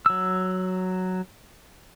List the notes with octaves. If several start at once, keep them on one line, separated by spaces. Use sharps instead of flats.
F#3 E6